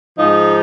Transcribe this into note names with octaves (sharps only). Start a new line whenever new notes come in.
G#2 F3 G#3 D#4